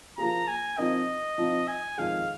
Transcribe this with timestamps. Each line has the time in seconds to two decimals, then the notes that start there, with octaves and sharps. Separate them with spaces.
0.18 F3 A#3 G#4 A#5
0.48 G#5
0.78 F3 C4 D#4 A#4 D#5
1.38 F3 C4 D#4
1.68 G#5
1.98 F2 D#3 G#3 F5